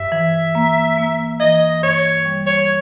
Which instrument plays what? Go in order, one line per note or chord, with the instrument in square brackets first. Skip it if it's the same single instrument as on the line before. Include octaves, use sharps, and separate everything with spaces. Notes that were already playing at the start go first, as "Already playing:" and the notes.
Already playing: [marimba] G2 [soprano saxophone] E5
[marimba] E3
A#3
A#3
[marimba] E3 [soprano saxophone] D#5
[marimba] G2 [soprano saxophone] C#5
[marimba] G3
[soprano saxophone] C#5